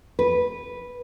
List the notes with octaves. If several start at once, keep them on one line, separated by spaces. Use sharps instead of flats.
B4